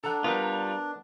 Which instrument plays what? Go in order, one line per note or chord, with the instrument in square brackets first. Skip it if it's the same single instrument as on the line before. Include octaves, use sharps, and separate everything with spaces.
[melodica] D4 [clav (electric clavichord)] A4 F#5 [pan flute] A#5
[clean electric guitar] G3 F4 [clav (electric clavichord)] B3 A#4